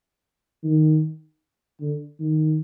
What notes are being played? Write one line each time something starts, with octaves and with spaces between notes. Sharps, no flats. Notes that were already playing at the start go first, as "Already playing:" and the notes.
D#3
D3
D#3